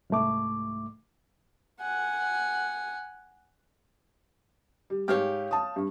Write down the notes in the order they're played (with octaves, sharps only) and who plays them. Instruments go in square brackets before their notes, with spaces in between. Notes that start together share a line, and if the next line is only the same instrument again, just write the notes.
[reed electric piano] C2 G#2 A3 D6
[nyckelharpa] F#5 G#5
[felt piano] G3
[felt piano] G#2 G4 F6 [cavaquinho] C#5 F5 G5
[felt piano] A5 D#6
G2